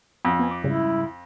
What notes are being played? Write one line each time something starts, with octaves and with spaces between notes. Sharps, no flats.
F2
B3 G#5
D6
G#2 C#3 G3 E4